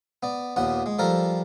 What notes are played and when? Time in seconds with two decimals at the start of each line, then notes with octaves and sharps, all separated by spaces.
0.23 B3 D5
0.56 D#2 A#2 B3 F#5
0.86 G#3
0.99 F3 G3 A4 A#4